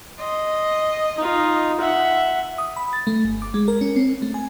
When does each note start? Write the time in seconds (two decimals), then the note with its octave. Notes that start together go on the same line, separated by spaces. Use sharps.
0.20 D#5 C6
1.17 D#4 F4
1.80 E5 F#5
2.58 D#6
2.76 B5
2.93 A6
3.07 A3
3.25 G1
3.42 D6
3.54 G#3
3.68 A#4
3.81 C#4
3.96 C4
4.22 A3
4.34 G#5